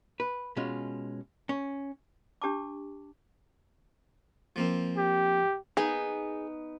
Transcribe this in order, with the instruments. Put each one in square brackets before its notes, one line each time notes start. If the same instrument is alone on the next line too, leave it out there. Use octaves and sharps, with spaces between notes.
[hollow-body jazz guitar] B4
B2 G#3 C#4 F4
C#4
[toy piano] D4 G4 A5 D6
[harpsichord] F3 A#3 C4
[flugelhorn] G4
[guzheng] B3 D#4 [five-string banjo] G#4